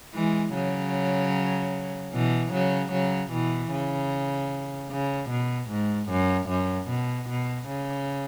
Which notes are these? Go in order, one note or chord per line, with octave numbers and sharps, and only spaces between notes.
E3 G#3
C#3 F#3
B2 E3
C#3 F#3
C#3 F#3
B2 E3
C#3
C#3
B2
G#2
F#2
F#2
B2
B2
C#3